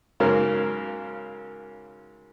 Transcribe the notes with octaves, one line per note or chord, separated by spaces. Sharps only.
G#2 C#3 F#3 A#3 A#4